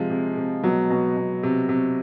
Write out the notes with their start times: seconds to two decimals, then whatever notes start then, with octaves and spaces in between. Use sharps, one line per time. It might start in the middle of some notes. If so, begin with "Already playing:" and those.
Already playing: C3 F3 G#3
0.10 C3
0.37 C3
0.63 B2 F#3
0.90 B2
1.16 B2
1.43 C3
1.69 C3